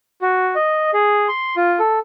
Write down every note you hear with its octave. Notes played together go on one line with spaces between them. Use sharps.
F#4
D#5
G#4
C6
F4
A4